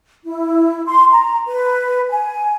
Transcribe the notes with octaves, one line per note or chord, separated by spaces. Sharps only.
E4
C6
A#5
B4
G#5